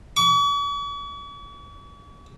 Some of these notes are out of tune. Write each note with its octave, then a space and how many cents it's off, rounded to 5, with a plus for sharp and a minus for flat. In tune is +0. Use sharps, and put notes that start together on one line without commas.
C#6 +45